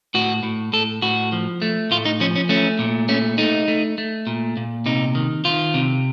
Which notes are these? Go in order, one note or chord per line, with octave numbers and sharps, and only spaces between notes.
A2 F#4
A2
A2 A4
A2 F#4
F3
A3
A2 F4
D#4
F3 C#4
C#4
A3 C#4
A#2
A3 C#4
A3 D#4
A3
A3
A#2
A#2
C3 D#4
D#3
D#3 F4
C3